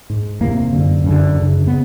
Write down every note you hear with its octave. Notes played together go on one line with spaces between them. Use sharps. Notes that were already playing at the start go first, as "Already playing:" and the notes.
G#2
E2 C3 A#3
F#2 D3
F#2 D3
F#2 C#3
C#3 B3